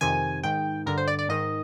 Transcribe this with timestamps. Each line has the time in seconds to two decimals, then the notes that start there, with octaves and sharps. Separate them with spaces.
0.01 F2 C3 D#3 G#5
0.43 G#2 D#3 G5
0.86 G2 D3 A#4
0.98 C5
1.08 D5
1.19 D5
1.29 G#2 D#3 D#5